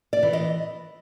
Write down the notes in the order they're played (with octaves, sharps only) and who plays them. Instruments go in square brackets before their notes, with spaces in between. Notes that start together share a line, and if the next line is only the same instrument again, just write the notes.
[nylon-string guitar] D5
E3
D#5